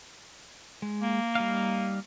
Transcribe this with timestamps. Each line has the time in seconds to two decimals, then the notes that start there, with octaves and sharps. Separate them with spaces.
0.82 G#3
1.02 A#3
1.35 G3 D#4 F5